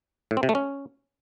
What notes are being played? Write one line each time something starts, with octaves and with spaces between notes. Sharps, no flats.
A2
C4
C3
A3
C#4